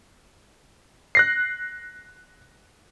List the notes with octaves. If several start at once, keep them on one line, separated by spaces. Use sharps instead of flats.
F#6 A#6 C7